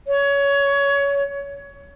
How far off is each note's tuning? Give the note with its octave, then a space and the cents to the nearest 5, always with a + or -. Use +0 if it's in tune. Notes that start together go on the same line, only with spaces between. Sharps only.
C#5 +20